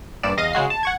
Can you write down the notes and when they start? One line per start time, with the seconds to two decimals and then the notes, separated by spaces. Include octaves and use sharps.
0.23 A#1 G2 D5 E7
0.37 E2 D#5 F5 A#6 D#7
0.53 C#3 G#3 F#4 C7
0.70 A5
0.83 F#5 C#6 G#6